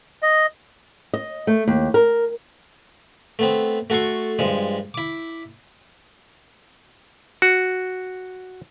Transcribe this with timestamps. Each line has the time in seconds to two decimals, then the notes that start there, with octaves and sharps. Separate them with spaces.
0.22 D#5
1.14 D#5
1.47 A3
1.68 D#2
1.94 A#4
3.39 A3 B3 C4
3.90 A3 F#4 A4 C6 C#6
4.39 G2 F3 G#3
4.94 E4 D6
7.42 F#4